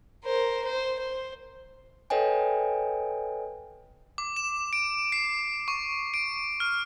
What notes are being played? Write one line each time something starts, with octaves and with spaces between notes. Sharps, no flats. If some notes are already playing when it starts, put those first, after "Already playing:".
A#4 C5
C5
C5
A4 B4 C#5 D#5 G5 G#5
D6
E7
D7
C7
C#6
D7
F6